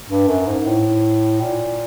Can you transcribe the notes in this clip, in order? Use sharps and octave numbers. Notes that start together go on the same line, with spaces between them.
G2
F#2
G#2
A2
A#2